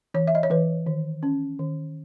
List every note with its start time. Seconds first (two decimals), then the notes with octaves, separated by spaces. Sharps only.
0.14 E3 C#5
0.28 E5
0.35 D#5
0.43 C#5
0.50 E3 B4
0.86 D#3
1.23 C#4
1.59 D#3